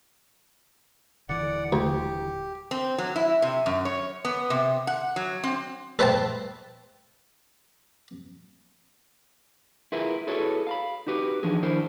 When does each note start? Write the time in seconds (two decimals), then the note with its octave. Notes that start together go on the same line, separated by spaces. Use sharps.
1.29 D#1 D3 E3 D5 F#5
1.73 D2 G4
2.71 C4
2.98 F#3
3.16 E4
3.42 C3
3.66 F#2
3.85 C#5
4.25 B3
4.50 C3
4.87 F#5
5.16 F#3
5.44 C4
5.99 A4 B4 C5 G5 A5
9.92 E4 F4 G#4 A#4 B4 E5
10.27 E4 F#4 G#4 A4 B4 C#5
10.67 F5 A#5 B5
11.07 D#4 F#4 G4 B4
11.43 E3 F3 D4 D#4 G#4
11.63 D#3 D4 E4 A#4 C5